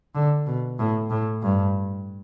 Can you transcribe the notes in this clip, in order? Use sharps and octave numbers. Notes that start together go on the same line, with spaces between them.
D3
B2
A2
A2
G2